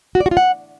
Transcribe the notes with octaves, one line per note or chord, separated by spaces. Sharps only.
F#4
D5
F#4
F4
F#5